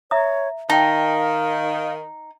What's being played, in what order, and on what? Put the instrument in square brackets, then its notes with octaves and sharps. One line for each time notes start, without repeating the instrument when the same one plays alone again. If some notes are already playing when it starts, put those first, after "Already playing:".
[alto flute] C#5 [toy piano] E5 A#5 D#6
[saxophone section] D#3 [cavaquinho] D#4 [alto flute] F5 [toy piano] G5 A5